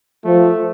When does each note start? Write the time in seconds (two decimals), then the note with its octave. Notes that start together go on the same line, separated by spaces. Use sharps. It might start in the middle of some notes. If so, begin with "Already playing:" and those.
0.24 F3 A3